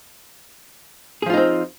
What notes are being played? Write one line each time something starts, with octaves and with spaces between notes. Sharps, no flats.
F3 C4 D#4 F4 G#4